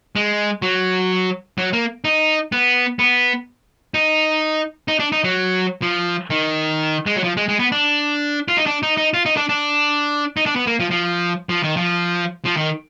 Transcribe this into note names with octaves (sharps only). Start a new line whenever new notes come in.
G#3
F#3
F#3
A#3
D#4
B3
B3
D#4
D#4
D4
D#4
F#3
F3
D#3
G#3
F#3
F3
G#3
G#3
B3
D4
F4
D#4
D4
D#4
D#4
F4
D#4
D4
D4
D#4
D4
B3
A#3
F3
F3
F3
D#3
F3
F3
D#3